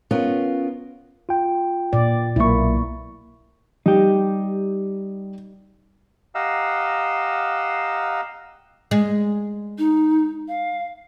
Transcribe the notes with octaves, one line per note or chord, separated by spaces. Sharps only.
B3 C#4 F4 A#4
F4 G5
A#2 D5
B1 A#3 E4 C#6
G3 D#4 G4
G4 D#5 F5 F#5 A#5 E6
G#3
D#4
F5